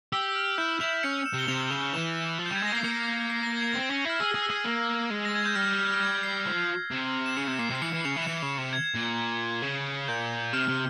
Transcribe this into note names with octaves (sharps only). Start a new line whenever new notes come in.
G4 E6
E6
F6
E4 G6
E4 F7
C#4 C#7
E7
C3
G7
C3 F7
C#3 F7
E3 E7
F3
G6
G3
G#6
G#3 A#6
A#3 C7
A#3 C#7
C7
A#6
G#6
C4 A#6
C#4
E4 F6
G#4 E6
G#4
E6
G#4
A#3
G#3
A#6
G#6
G6
G3 F6
F6
G6
F6
G#6
C7
F3
C3
E7
C#3 C#7
C3
A#2 C7
C3 C7
E3 C#7
E3
C#3 F7
E3
E7
E3 C#7
C#3
C3
G#6
A#2
C#3
A#2 G6
C3 F6
C3